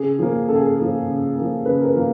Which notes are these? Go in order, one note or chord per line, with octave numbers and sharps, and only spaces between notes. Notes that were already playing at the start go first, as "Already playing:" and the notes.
Already playing: C#3 G#4
F3 A#3
C#3 A4
G#4
A4
F3 A#3
C#3
F3 A#3
C#3 B4
A#4
B4
F3 A#3